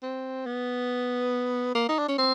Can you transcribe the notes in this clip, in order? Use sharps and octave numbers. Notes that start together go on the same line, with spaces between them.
C4
B3
A#3
D#4
D4
C#4
C4